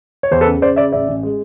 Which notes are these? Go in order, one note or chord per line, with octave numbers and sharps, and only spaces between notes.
C#5
E2 C5
A4 B4
C#3
C#3 C5 D5
C#3 D5 E5
A1 D5 E5
A1
G#3